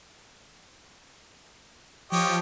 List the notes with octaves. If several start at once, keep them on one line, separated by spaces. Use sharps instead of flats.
F3 G4 C#5 D#5